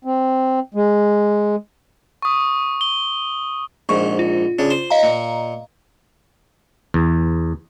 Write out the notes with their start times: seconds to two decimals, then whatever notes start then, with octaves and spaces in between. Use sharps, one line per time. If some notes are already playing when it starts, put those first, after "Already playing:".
0.05 C4
0.75 G#3
2.22 C#6 D#6
2.81 G7
3.89 A#1 G#2 C#6
4.19 F4
4.59 C#3 D4
4.70 C5
4.90 D#5 F5 A#5
5.03 A#2
6.94 E2